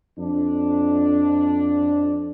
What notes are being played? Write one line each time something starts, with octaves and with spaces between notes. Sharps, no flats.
F2 D4